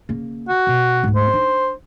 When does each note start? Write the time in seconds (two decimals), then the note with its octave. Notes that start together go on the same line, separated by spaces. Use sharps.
0.09 C#3 A#3
0.49 F#4
0.67 B2
1.03 D2 G#2
1.16 C5
1.33 D4 D#4